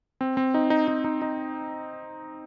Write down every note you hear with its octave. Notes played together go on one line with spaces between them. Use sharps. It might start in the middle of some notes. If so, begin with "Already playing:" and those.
C4
C4
D#4
D#4
D#4
D#4
D#4